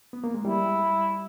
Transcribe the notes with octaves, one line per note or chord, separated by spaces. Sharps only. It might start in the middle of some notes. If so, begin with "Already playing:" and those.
B3
A#3
G#3
G3 E4